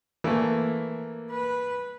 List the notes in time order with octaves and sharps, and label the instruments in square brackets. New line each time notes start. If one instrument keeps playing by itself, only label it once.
[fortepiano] E3 A3 [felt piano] A#3
[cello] B4